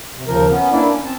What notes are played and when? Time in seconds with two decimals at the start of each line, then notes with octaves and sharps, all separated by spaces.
0.16 C3
0.28 D#2 C#3 F3 A#4
0.50 B3 C#4
0.72 A#3 D4 E4 D5
0.90 C#4
1.04 C4 A5